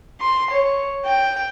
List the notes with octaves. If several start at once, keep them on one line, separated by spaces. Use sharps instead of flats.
C6
C#5
G5